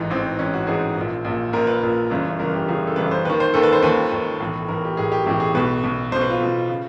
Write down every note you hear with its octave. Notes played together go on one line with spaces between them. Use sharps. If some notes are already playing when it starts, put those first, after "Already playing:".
Already playing: A1 G#2 E3
A1 G#2 E3 C4
A1 G#2 E3 C#4
F#4
A1 G#2 E3 G#4
A#1 A#2
A#1 A#2
A#1 A#2 A#4
B4
A#1 A#2
G1 F#2 C#3 E3
G1 F#2 C#3 E3 A#4
G4
G1 F#2 C#3 E3 G#4
A4
G1 F#2 C#3 E3 B4
C5
D#2 D#3 B4
C5
D#2 D#3 A4
B4
C5
D#2 D#3 B4
D#2 D#3
B1 A2 E3
B1 A2 E3 A#4
G4
B1 A2 E3 G#4
G4
B1 A2 E3 G4
G#4
B1 B2 B4
B1 B2
B1 B2 C5
B4
F4
B1 B2
C#3